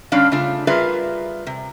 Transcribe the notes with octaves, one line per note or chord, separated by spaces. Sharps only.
D3 G3 C#4 D4 F5
C#3 A3 D4 F4
G3 F4 G#4 A#4 B4 E5
C3